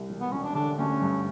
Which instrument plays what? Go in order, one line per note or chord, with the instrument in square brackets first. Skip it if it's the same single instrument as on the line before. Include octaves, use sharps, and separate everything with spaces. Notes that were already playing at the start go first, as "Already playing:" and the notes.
Already playing: [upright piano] C2
E1
[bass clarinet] B3
[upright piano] E1 [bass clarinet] C#4
[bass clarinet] D4
[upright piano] D3 [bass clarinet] D4
[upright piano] D2 [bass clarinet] C#4
[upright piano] G2